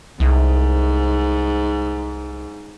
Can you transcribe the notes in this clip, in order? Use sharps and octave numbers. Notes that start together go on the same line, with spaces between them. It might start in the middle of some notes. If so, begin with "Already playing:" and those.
C2 G#2